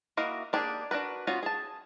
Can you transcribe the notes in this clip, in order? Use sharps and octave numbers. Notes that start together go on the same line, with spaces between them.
A#3 E4 F#4 D#5 F5
A#3 D4 G4 G#4
D4 F#4 A#4 B4
B3 C#4 F4 F#4
G#4 A5